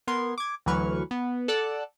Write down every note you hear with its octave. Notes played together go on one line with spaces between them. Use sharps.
B3 A#4 C6 G#6
D6 G#6
D2 E3 F#3 B4 C#6 F6
B3
A4 D5 F#5 A5 E6 F#6